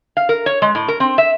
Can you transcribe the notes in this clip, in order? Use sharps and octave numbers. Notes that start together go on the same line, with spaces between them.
F5
A#4
C#5
G#3
A2
A#4
C4
E5